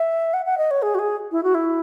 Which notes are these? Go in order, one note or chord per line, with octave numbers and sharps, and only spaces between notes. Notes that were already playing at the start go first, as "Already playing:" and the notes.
Already playing: E5
F#5
F#5
D#5
C#5
G#4
F#4
G#4
E4
F#4
E4